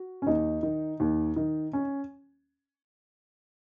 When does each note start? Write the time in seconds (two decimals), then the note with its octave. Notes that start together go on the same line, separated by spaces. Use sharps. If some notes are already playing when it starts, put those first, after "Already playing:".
Already playing: F#4
0.22 C#4
0.27 D#2 D#4
0.63 D#3
1.00 D#2
1.36 D#3
1.73 C#4